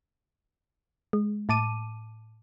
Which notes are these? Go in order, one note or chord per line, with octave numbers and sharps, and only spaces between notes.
G#3
A2 A5 D6 D#7